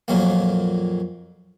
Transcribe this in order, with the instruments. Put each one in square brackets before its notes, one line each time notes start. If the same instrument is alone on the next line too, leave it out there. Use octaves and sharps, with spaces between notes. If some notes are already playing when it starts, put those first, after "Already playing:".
[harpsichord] F2 A#2 F#3 A#3